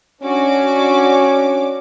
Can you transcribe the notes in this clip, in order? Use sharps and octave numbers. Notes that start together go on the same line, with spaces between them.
C#4 D4 F#4 D6